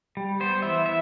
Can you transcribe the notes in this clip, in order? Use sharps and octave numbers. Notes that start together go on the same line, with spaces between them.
G3
B3 C5
E3 E5
E5